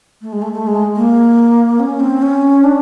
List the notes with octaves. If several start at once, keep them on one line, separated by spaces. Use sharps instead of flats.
A3
G#3
A3
A3
G#3
A#3
C#4
C4
C#4
D4